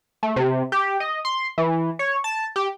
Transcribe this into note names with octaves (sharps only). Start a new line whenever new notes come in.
A3
C3
G4
D#5
C6
E3
C#5
A5
G4